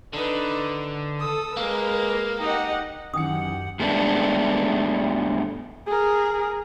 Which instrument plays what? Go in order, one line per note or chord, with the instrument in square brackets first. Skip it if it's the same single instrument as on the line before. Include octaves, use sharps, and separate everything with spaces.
[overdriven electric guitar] D3 [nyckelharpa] D#4 B4
[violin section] A4 E6 [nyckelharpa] D#6
[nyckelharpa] G#3 A#4 [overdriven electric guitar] A#3 [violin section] B4
[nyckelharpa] D#4 [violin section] G4 D#5 F#5
[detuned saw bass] F#2 [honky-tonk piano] D#3 E3 C#7 [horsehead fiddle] G4 F#5 [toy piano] D#6
[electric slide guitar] G2 G#3 A3 B3 D4
[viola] G#4 A#4